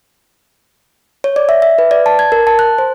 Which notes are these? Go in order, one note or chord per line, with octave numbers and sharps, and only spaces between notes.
C#5
D5
E5
E5
B4
D5
A5
G#6
A#4
A5
F#6
C5